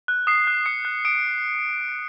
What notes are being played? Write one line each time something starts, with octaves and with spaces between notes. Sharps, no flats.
F#6
D#6 C7
F#6
D#6 C#7
F#6
D#6 D7